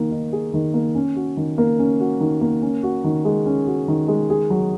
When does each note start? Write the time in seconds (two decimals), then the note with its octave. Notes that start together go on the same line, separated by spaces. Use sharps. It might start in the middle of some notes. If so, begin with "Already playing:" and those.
Already playing: D#3 A#3
0.11 D#4
0.32 G#4
0.54 D#3
0.74 A#3
0.95 C#4
1.16 F#4
1.37 D#3
1.58 A#3
1.79 C#4
2.00 F#4
2.20 D#3
2.41 A#3
2.62 C#4
2.83 F#4
3.04 D#3
3.25 G#3
3.46 C#4
3.67 F#4
3.88 D#3
4.08 G#3
4.30 G#4
4.50 F#3